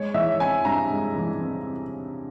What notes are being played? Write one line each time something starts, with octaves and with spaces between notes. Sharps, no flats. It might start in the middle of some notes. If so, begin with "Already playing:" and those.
Already playing: G#3 C#5
E3 E5
C4 G#5
G2 A#5
G#3
E3
C4